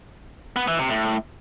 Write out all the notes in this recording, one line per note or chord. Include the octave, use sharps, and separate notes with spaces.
B3
E3
C3
A2